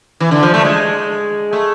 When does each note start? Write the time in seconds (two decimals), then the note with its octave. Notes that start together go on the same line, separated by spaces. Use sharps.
0.20 E3
0.31 D3
0.43 F3
0.54 A3
0.65 G#3
1.53 A3